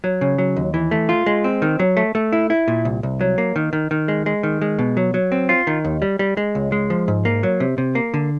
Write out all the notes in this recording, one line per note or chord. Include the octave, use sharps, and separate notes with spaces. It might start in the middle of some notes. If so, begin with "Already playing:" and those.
F#3
C#3
F#3
D#2
E3
A3
F4
G#3
C4
D#3
F#3
A3
A3
E4
E4
A#2
C2
C2
F#3
A#3
D#3
D#3
D#3
G#3
G#3
D#3
G#3
B2
F#3
F#3
C4
F4
D#3
D#2
G3
G3
G#3
C#2
G#3
F3
G#2
A#3
F#3
C3
C3
A#3
D3